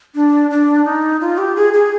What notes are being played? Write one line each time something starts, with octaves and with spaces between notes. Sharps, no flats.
D4
D4
D#4
F4
G4
G#4
G#4